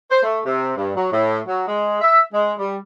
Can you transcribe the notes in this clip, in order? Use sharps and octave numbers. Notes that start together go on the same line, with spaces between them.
C5
A3
C3
G2
F#3
A2
F#3
G#3
E5
G#3
G3